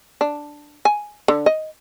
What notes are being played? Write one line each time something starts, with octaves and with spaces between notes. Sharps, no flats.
D4
G#5
D3
D#5